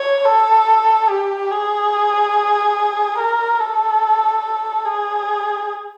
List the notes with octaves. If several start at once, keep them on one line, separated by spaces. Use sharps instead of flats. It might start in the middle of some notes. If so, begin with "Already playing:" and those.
Already playing: C#5
A4
G4
G#4
A#4
A4
G#4